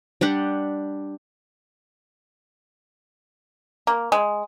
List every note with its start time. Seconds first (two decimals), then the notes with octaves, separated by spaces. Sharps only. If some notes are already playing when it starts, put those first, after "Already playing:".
0.21 G3 D4 G4 F#5
3.87 A#3
4.12 G#3